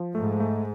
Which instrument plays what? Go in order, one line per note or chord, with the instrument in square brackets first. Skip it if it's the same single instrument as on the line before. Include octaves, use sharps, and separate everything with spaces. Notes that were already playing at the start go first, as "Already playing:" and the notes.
Already playing: [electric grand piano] F3
[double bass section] G#2 [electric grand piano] A3
[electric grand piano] A3